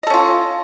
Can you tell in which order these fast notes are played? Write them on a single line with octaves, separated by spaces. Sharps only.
D#5 A4 C#4 F4